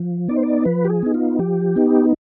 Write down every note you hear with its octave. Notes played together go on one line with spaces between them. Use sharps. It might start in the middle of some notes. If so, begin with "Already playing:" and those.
Already playing: F3
B3 D#4 D5
C5
D5
F3 B4
G4
G#4
B3 D#4
F4
F3 G4
B3 D#4